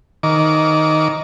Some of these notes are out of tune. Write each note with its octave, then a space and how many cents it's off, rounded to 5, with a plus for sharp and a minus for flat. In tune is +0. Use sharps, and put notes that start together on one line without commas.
D#3 +0 D6 -25